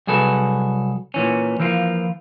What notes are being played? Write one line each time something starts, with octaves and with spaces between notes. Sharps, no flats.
C2 F#3 G#4 A4 B4
A#2 E3 C#4
E3 F3 A#3 F4